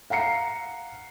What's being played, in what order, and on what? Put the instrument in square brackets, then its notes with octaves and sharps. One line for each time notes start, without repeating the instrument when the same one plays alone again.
[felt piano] F5 F#5 A#5 C7 C#7